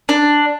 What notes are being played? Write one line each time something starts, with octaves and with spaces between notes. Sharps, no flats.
D4